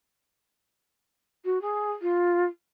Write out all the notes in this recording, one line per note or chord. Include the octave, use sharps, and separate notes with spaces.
F#4
G#4
F4